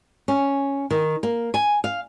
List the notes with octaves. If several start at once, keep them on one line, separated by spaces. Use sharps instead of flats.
C#4
D#3
A#3
G#5
F5